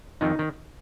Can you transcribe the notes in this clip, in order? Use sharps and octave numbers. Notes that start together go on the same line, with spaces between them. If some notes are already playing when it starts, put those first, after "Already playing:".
F2 D#3 D#4
D#3